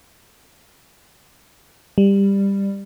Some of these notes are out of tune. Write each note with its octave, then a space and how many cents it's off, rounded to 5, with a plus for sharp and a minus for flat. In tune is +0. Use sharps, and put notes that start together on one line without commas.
G3 +15